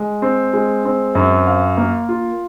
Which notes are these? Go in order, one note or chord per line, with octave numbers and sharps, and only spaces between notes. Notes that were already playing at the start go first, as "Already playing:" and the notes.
Already playing: G#3
C4
G#3
C4
F#2
F5
A#3
F4